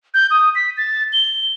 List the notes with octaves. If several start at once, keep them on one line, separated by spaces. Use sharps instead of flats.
G6
D#6
B6
A6
G7